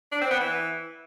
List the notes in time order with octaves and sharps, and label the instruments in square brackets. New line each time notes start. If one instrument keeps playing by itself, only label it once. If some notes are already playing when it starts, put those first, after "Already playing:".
[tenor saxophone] D4
C4
B3
E3